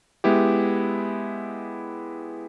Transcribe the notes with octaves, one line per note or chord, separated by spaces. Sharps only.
G#3 B3 E4 G4